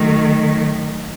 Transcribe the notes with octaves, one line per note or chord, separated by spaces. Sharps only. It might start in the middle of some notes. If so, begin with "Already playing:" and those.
Already playing: D#3 F#3 A3